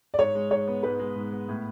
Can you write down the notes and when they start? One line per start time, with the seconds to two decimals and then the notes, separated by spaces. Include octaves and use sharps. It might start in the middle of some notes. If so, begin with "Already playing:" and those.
0.14 D5
0.18 G#2 C#5
0.35 G#3
0.50 G#2 C#5
0.67 B3
0.83 G#2 B4
0.99 G#3
1.15 G#2
1.32 B3
1.49 A2